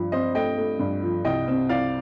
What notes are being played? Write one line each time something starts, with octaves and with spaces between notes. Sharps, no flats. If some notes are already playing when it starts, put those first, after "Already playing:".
Already playing: G2 F3
C4 C5 D#5
A3 D#5 G5
A3
G2
F3
C2 D#5 G5
C4
C2 D5 F5